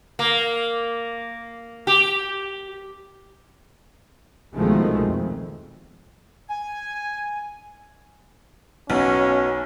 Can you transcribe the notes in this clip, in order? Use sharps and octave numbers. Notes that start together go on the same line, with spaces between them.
A#3
G4
C2 B2 D#3 F3 G#3 A3
F2
G#5
B1 B2 C#4